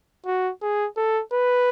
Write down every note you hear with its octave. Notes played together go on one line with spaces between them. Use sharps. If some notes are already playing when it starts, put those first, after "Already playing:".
F#4
G#4
A4
B4